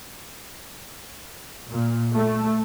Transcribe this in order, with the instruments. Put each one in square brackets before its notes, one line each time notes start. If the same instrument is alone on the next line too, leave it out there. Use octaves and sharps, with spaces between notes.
[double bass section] A#2
A3